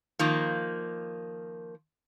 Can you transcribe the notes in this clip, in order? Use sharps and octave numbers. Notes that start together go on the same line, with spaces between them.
D#3 F3 A#3